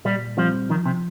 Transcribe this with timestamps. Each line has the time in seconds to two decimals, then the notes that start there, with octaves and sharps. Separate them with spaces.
0.05 A#2 G3
0.37 F3 G3 C4
0.69 D#3 F3
0.85 C3